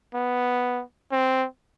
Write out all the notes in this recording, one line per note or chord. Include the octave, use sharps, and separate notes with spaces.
B3
C4